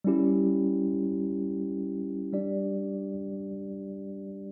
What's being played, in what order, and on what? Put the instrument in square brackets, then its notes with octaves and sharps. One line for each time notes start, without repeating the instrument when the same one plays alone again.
[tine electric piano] G3 C#4 E4 G4
G3 D4 G4 D5